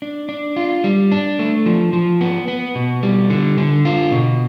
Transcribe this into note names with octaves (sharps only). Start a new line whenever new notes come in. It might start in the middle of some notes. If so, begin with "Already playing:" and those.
D4
D4
F4
G3
D4
A3
F3
F3
B3
B3
B2
G3
D3
D3
F4
B2